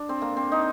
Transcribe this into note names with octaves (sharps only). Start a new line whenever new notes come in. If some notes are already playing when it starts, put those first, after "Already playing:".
Already playing: D4
C4
A#3
C4
D#4